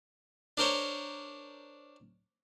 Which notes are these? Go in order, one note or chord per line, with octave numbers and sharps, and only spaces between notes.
D4 A#4 C5 C#5